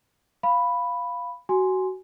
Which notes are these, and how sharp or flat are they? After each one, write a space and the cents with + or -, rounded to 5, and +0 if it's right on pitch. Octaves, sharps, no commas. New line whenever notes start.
F5 +0 B5 +0
F#4 +20 G#5 +0 C6 +0